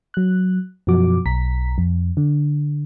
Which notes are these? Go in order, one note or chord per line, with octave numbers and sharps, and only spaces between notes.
F#3 F#6
F#2 B2 F3 F#4 D6
B1 A#5 B6
F2
D3